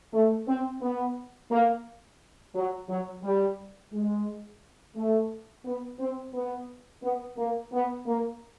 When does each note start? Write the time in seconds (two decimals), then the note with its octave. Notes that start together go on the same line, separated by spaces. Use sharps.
0.13 A3
0.47 C4
0.82 B3
1.50 A#3
2.55 F#3
2.89 F#3
3.24 G3
3.92 G#3
4.96 A3
5.65 B3
5.99 C4
6.34 B3
7.03 B3
7.37 A#3
7.73 B3
8.07 A#3